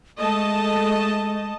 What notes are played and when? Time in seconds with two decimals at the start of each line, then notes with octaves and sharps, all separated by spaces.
0.20 G#3 A3 D#5 A5